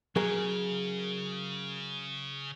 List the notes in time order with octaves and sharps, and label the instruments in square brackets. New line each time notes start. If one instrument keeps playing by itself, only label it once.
[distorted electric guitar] C#3 [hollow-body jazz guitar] F#3 G#4 A#4